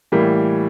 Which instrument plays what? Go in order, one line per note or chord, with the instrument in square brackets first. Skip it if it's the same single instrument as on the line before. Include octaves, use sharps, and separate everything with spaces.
[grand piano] A2 E3 G3 A#3